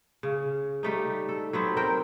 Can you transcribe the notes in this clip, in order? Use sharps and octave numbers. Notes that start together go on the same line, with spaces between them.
C#3
G3 A3 D#4
A4
F#3 B3 C4
C4 A#4 G5